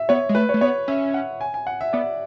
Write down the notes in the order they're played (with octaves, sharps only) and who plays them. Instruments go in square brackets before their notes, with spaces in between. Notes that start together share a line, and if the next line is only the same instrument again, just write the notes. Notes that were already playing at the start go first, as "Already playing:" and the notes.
Already playing: [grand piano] E5
[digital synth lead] B3 [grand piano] C#5
[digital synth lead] G#3
[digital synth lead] A3 [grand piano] B4
[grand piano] C#5
[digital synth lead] A3
[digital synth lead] B3 [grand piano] C#5
[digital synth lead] C#4 [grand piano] E5
[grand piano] F#5
G#5
G#5
F#5
E5
[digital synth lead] B3 [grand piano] D5